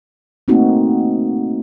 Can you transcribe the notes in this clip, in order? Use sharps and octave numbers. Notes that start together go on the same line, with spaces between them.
A3 A#3 C4 D#4 F#4